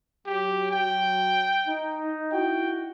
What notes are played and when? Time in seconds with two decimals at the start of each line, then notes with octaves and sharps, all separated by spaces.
0.26 F#3 G4
0.71 G5
1.67 D#4
2.32 D#4 E4 F#4 G5